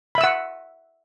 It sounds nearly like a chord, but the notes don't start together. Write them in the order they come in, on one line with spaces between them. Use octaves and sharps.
B5 E5 E6 F#5